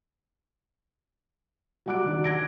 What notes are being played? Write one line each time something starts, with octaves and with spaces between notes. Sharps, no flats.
F#3 G3 F#5 D6 F#6 D7
D#3 F#3 D4
G#6 A#6 D7